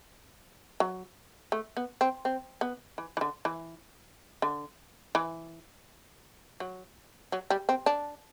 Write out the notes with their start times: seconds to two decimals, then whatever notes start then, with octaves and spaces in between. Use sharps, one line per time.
0.80 F#3
1.52 A3
1.77 B3
2.01 C4
2.25 C4
2.61 B3
2.98 E3
3.17 E3
3.21 D3
3.45 E3
4.42 D3
5.15 E3
6.60 F#3
7.32 F#3
7.50 G3
7.69 C4
7.86 D4